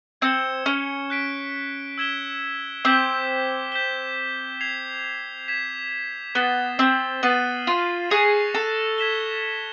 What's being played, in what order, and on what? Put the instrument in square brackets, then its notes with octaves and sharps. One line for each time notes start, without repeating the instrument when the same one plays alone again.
[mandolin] C4 [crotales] G#6 C#7 E7 G7
[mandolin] C#4
[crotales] F#6 B6 D7
E6 G#6 B6 E7 G7
[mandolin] C4 [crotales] D6 G6 B6 E7 G7
[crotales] G6 B6 E7 G7
G#6 C7 F7
G#6 B6 E7
[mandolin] B3 [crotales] A6 C7 E7 G7
[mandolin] C4
[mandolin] B3 [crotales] F6 A6 C7 D#7 F#7
[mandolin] F4
[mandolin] G#4 [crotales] C#6 F#6 A#6 C#7 F7
[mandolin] A4
[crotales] G#6 B6 E7 G7